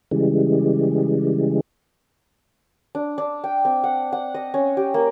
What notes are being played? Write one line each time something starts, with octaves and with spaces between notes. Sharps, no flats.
C#3 E3 G3 G#3
D4
D4
G5
C4
F#5
F#5
D#5
C#4
G4
A#3